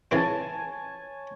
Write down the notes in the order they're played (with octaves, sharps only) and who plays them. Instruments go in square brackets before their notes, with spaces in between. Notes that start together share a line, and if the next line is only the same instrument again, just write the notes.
[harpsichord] C#3 E3 C4 [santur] C#5 G#5 A5